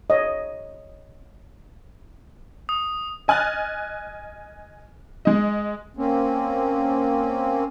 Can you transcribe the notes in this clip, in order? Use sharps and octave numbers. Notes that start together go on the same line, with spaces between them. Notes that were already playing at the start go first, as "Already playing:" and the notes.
C#5 D#5
D#6
D#5 G#5 F6 F#6 A6
G#3 D#5
A#3 C4 C#4